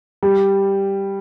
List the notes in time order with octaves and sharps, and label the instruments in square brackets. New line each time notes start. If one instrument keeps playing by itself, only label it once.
[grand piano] G3